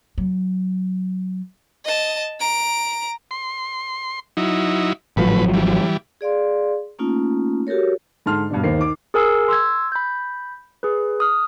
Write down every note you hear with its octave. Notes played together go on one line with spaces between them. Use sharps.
F#3
D#5 A5
A#5 D7
C6
F#3 D#4 E4
G#1 A2 F3 F#3 B4
E3 G3
G#4 D5 F5 C6
A3 A#3 C#4 D#4 F4
F#4 G4 A4 A#4 C#5
G#2 D3 A5 C6 F6
G2 B2 D4
D#2 D#4 A#4 C5 C7
D#3 D6
G#4 A#4 G#5 E6 C7
C6 E6 G#6
B5 G6
G#4 B4
D#6 F6